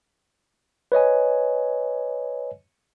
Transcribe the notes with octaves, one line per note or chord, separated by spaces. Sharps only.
B4 C#5 D#5 G#5